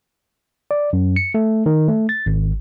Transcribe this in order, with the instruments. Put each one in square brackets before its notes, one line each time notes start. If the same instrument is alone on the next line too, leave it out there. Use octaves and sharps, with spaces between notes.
[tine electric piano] D5
F#2
C#7
A3
D#3
A3
A6
G#1